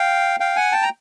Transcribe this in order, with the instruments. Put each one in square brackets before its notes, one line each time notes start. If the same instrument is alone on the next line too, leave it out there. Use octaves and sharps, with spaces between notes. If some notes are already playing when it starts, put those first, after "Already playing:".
Already playing: [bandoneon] F5 G5
F5 G5
F#5 G#5
G5 A5
A#5